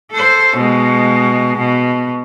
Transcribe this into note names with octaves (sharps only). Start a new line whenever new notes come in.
A4 C5
B2 G#3
B2